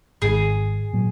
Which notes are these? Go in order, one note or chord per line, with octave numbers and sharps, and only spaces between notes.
G#1 G#2 D#3 G#4
A#2 F#3